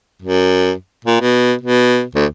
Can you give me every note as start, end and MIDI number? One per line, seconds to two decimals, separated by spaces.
0.22 0.72 42
1.05 1.20 46
1.21 1.54 47
1.61 2.02 47
2.15 2.25 38